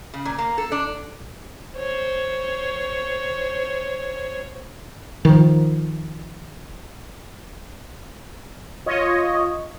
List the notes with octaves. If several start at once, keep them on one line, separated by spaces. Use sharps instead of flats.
C#3
A#2
A#3
A4
D4
C5 C#5
D#3 F3
F4 C#5 D#5